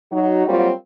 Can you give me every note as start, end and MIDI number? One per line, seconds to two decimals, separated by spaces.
0.12 0.46 54
0.12 0.46 63
0.12 0.46 66
0.47 0.70 54
0.47 0.70 55
0.47 0.70 58
0.47 0.70 60
0.47 0.70 65
0.47 0.70 66